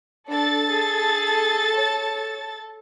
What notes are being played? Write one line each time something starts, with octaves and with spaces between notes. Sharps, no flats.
D4 A4 A6
G#4
C#5